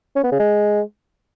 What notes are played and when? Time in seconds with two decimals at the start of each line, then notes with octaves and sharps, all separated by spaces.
0.16 C#4
0.24 B3
0.32 C#3
0.39 G#3